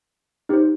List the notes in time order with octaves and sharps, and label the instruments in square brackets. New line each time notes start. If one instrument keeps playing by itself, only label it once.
[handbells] D#4 G4 C5